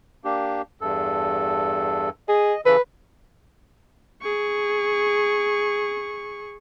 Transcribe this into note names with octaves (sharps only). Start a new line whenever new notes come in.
A#3 D4 G4
E2 G2 A4
G#4 D#5
C#3 E3 A4 B4
G#4 C#6